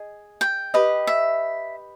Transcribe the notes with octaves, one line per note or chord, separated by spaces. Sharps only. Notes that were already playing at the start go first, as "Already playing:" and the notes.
Already playing: G#4 D#5
G5
G4 B4 D#5
E5